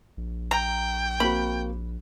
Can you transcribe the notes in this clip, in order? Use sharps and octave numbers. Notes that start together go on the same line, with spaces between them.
A#1
G5 A#5
A#3 C4 F#4 B5